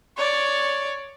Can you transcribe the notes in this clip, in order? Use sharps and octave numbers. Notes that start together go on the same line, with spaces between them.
C#5 D5